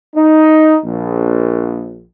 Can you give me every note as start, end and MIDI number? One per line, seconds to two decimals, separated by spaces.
0.15 0.77 63
0.84 2.02 34